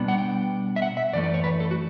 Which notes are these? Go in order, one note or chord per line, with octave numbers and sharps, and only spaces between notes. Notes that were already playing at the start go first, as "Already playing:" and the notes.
Already playing: B2 G3 B3 D4
F#5
G5
E5
F#5
E5
F#2 E3 A3 D5
D5
C#5
B4
A4
F#4